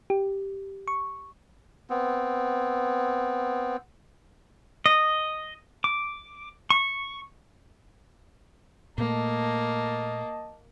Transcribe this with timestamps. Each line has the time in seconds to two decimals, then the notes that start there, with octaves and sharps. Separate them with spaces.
0.10 G4
0.88 C#6
1.90 B3 C4
4.86 D#5
5.84 D6
6.70 C#6
8.98 A#2 A3 A#3 D#5 A5